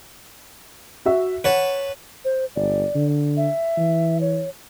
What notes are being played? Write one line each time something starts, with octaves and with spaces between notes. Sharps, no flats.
F#4 E5
B4 C#5 F#5 A5
C5
G1 D5
D3
E5
E3
C#5